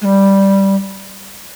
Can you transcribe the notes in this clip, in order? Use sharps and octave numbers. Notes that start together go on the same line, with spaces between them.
G#3
G3